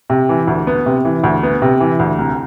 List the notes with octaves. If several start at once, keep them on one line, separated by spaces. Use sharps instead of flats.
C3
E3
D2
B3
C3
E3
D2
B3
C3
E3
D2
C2